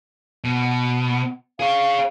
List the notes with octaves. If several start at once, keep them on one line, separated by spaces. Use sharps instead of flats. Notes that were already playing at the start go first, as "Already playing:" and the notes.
B2
G#4 C#5 F5